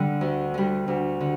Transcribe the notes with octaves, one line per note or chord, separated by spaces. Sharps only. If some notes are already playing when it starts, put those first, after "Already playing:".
Already playing: D3 G3
D2
D3 G3
D2
D3